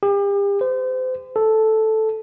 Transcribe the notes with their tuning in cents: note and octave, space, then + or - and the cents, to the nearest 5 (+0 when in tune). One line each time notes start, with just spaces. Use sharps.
G4 +40
C5 -35
A4 -5